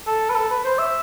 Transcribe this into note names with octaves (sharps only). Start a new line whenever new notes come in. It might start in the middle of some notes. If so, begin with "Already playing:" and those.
A4
B4
A4
B4
C5
E5